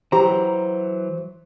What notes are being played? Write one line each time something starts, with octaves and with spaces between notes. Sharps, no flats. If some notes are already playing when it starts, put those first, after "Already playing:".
E3 F#3 G4 C5 A#5